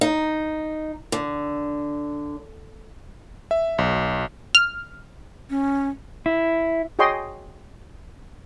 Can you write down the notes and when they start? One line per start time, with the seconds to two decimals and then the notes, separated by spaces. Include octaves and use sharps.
0.01 D#4
1.12 D3
3.51 E5
3.78 B1
4.55 F6
5.50 C#4
6.26 E4
6.99 F#4 G#4 C#5 D#5 G5 C6